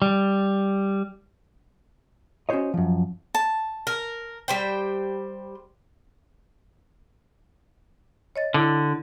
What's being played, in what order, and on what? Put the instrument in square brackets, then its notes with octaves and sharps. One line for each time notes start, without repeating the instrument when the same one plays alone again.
[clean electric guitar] G3
[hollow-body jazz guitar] C#4 F#4 G4 C5 C#5 D#5
F#2 F3
[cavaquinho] A5
[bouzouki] A#4
G3 C5 G5
[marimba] C#5 D#5 A6
[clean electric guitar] D3 [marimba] E4